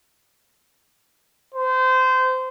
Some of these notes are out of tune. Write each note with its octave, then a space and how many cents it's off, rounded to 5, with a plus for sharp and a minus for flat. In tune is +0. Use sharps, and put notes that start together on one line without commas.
C5 -25